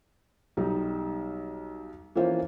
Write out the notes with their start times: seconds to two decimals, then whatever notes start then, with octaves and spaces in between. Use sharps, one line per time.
0.57 B1 G3 D#4
2.15 E3 F3 A#3 C#4 F4 C5